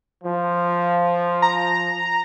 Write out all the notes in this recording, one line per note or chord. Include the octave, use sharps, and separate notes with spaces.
F3
A#5